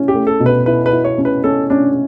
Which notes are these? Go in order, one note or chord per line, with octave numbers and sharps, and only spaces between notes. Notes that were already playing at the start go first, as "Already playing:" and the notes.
Already playing: C#4 E4
G4
A3
A4
B2
B4
E4 B4
B4
E4
C#5
C#4
B4
C#4 A4
C#4 D4